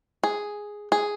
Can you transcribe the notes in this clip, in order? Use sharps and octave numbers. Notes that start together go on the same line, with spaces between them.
G#4
G#4